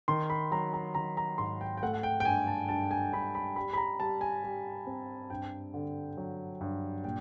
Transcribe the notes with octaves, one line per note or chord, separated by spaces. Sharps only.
D#3 C6
B5
F#3 A#5
A#5
D#3 A#5
A#5
G#2 C6
G5
G5
A3 F#5
F#5
G5
G5
G2 G#5
A5
G2 A5
G#5
G2 B5
B5
G3 B5
B5
A#5
G3 A5
G#5
G3
C4
G2 G5
D3
F#3
G2
A#2 G5